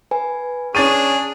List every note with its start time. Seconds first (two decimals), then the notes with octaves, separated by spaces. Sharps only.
0.11 B4 G#5
0.75 C#4 D4 G#4 C#6 A6 C7 D#7